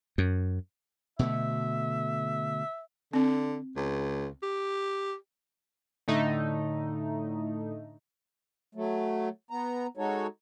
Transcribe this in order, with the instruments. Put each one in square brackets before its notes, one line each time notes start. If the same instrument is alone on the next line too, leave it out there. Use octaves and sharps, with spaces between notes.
[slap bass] F#2
[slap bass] B2 D3 A3 [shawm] E5
[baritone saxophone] D3 [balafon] C4
[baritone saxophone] C#2
G4
[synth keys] A2 D3 A3 D#4
[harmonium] F#3 A3
B3 A#5
G#3 D#4 F#4 A4 C#5